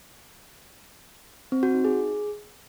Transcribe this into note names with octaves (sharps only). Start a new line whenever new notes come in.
C4
F#4
D#4
G#4